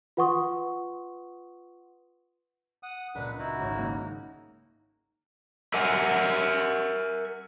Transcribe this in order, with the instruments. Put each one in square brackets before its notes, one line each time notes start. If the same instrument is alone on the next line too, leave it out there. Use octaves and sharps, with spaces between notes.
[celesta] F4 B4 F#5 C6 C#6 D#6
[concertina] F#5 D#6
[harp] C#2 A#2 [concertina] D4 B4
[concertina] D#4 E4 F#4
[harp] G#1 C#5
G#3 A#3 C#4
[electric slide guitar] A#4 E5 F#5 G#5